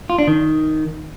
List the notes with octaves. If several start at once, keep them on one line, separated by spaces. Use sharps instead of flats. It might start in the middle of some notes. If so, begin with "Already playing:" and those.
F4
D4
D#3